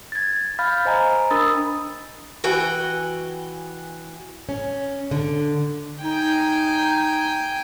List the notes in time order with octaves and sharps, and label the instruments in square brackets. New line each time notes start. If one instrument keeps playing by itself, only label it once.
[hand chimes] G#6 A6
F5 B5 F6 G6 A6
C5 D#5 G#5 A#5
D4 A#4 B5 D#6 E6 A6
[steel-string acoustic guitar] E3 F#4 G5 G#5
C#4
D3
[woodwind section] D#4 [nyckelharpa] G5 G#5